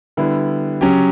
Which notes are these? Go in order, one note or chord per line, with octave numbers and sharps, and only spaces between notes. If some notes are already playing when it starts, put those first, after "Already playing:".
D3 G3 B3 E4
C#3 F#3 C#4 G4